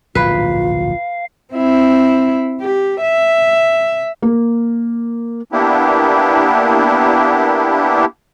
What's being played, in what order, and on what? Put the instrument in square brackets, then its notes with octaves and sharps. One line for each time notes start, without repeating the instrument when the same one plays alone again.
[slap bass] D1 A#1 G#2 [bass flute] F4 [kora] B4 [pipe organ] F5
[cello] C4 E4
G4
E5
[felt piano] A#3
[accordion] A#3 B3 D4 E4 G4